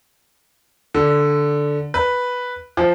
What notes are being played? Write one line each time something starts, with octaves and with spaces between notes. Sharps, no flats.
D3
B4
F3